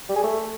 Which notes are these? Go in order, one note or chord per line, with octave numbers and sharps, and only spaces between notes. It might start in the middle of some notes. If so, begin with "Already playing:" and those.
G3
G#4
A3